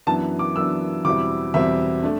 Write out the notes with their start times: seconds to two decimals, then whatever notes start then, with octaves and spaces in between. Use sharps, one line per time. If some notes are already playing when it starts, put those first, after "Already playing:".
0.07 F#2 E3 B3 D4 A5
0.39 D6
0.56 F#2 E3 B3 D4 E6
1.05 E2 B2 G3 C4 E4 D6
1.54 E2 B2 G3 C4 E4 E5
2.03 A3 D4